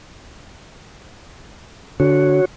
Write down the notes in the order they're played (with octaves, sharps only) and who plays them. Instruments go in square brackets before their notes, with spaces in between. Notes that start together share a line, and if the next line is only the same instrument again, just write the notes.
[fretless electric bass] D3 [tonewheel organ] F#4 C#5